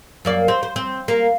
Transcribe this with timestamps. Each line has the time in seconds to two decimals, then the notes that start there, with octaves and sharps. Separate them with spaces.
0.25 F#2 A#3 D5
0.48 C4
0.63 C5
0.76 C4
1.08 A#3